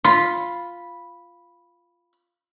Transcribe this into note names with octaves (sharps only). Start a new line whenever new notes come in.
F4 B5